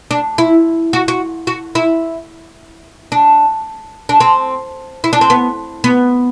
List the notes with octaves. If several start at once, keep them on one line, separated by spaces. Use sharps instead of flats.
D4
E4
F#4
F#4
F#4
E4
D4
D4
C4
E4
D4
C4
B3
B3